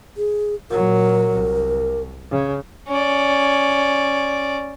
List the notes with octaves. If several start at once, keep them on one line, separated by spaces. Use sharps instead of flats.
G#4
A#2 F#3 A#4
C2
C#3
C#4 D5